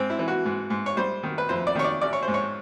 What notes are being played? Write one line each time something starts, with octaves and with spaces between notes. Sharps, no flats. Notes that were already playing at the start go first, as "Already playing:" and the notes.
Already playing: G#2 C4
E4
E3
F#4
G#2
G#2
C#5
G3 C5
D#3
B4
F2 C5
D5
D#3 C#5
D5
A1 D5
C#5
C5
G#2
C#5